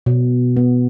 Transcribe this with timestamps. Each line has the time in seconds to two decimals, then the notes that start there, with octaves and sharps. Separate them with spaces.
0.06 B2
0.57 B3